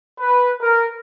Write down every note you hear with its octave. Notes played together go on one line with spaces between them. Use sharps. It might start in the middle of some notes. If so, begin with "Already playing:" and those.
B4
A#4